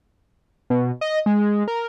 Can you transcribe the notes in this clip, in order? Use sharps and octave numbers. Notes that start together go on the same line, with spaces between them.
B2
D#5
G#3
A#4